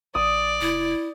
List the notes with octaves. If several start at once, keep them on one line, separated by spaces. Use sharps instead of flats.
A#1 D5 D#6
F1 E4